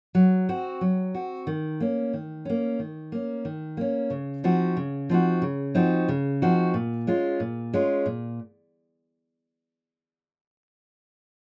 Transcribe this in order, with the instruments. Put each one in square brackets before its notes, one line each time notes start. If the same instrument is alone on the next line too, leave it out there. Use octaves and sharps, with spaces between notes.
[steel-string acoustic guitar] F#3
C4 F#4
F#3
C4 F#4
D#3
A#3 C#4
D#3
A#3 C#4
D#3
A#3 C#4
D#3
A#3 C#4
C#3
F3 C4 D#4 F#4
C#3
F3 C4 D#4 F#4
C#3
F3 C4 D#4 F#4
C#3
F3 C4 D#4 F#4
A#2
G#3 C#4 F4
A#2
G#3 C#4 F4
A#2